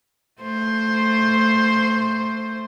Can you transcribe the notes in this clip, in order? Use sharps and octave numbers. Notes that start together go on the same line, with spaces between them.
A3 C5